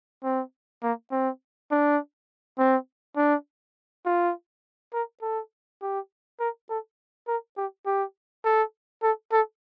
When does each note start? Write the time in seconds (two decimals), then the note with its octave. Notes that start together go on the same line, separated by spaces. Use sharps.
0.24 C4
0.83 A#3
1.11 C4
1.71 D4
2.59 C4
3.17 D4
4.05 F4
4.93 A#4
5.22 A4
5.81 G4
6.40 A#4
6.69 A4
7.28 A#4
7.57 G4
7.86 G4
8.45 A4
9.03 A4
9.32 A4